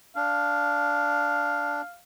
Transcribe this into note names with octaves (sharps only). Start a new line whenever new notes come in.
D4 F5